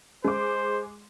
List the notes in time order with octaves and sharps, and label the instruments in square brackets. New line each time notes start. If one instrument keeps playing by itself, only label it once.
[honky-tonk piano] G#3 D6 [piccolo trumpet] C5